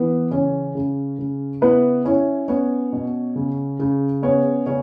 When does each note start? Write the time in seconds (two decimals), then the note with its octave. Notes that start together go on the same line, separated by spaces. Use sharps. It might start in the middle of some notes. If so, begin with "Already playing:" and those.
Already playing: E3 B3 B4
0.31 C#3 C#4 C#5
0.75 C#3
1.19 C#3
1.61 B3 E4 B4
2.05 C#4 E4 C#5
2.48 B3 C#4 C#5
2.93 B2
3.36 C#3
3.80 C#3
4.23 B3 C#4 C#5
4.66 C#3 C#4 C#5